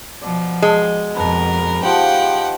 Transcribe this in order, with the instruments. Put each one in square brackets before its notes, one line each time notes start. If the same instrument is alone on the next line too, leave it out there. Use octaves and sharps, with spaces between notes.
[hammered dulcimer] B2 D5 [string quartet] F3
[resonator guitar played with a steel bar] G#3
[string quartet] F2 A#4 [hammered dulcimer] B2 B4
[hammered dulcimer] D#3 F3 [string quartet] G4 F#5 G5